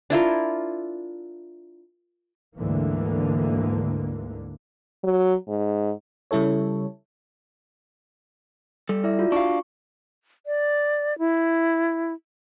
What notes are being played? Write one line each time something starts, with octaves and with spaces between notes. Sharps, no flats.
D4 E4 F4 A#4
D2 G#2 D3 E3 A#3
F#3
G#2
C#3 G3 E4 A4 C#5
G3 A4
E4 D5 E5
F4 F#4
D4 F5 C#6
D5
E4